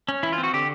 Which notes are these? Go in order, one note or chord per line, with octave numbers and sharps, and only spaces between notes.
C#4
E3 E4
F4
C4
F#4
D3 G4